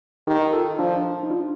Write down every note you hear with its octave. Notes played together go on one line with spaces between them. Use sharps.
D#3 D#4 G4
F4 A4
F3 D4 F4
D#4
D4 F4